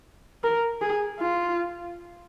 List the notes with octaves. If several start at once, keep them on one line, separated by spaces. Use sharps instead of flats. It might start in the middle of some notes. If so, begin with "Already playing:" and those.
A#4
G#4
F4